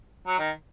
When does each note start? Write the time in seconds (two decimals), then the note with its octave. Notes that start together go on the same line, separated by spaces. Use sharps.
0.27 F#3
0.39 D#3